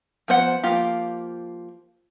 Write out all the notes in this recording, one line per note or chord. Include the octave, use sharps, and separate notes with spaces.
F3 B3 C5 F#5
F3 A#3 F4 G4